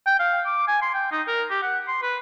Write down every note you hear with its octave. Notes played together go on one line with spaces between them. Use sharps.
G5
F5
D6
G#5
C6
G5
D#4
A#4
G4
F#5
C6
B4